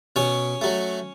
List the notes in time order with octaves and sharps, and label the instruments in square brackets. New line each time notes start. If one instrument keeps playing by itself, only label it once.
[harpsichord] B2 C#4 C#5
F#3 A3